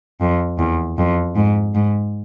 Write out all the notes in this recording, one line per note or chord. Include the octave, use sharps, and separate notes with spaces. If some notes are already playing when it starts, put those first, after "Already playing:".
F2
E2
F2
G#2
G#2